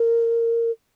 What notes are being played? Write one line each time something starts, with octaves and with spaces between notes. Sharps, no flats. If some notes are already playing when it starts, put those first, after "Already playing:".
Already playing: A#4